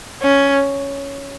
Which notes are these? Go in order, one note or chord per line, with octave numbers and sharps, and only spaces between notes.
C#4